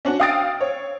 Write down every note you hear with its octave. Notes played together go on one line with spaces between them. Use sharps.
C#4 D4 F#4
F5 G5 D#6 E6 A6 D7
C#5